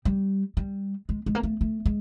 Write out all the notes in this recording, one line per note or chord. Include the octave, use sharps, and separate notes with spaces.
G3
G3
G#3
G#3
A#3
A3
A3
G#3